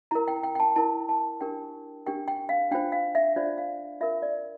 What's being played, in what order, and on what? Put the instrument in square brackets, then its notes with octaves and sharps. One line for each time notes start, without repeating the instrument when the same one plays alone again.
[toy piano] E4 A#4 A#5
G5
G5
G5
A5
E4 A#4 A5
A5
D4 G4 A#4 G5
D4 G4 A#4 G5
G5
F5
D4 F4 C5 G5
F5
E5
D4 F4 C5 D5
F5
F4 A#4 E5
D5